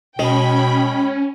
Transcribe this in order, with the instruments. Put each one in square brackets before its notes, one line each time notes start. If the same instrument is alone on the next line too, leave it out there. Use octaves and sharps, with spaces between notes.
[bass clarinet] B2 [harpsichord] G#3 [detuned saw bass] C#4 [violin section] G5 B5